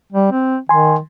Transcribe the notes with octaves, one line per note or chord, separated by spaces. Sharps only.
G3
C4
D#3 G#5 C6